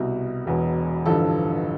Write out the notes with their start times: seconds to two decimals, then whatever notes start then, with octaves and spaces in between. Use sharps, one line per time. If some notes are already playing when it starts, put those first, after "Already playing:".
Already playing: C2 B2
0.45 E1 E2 B2
1.06 A1 G2 D3 F3 A4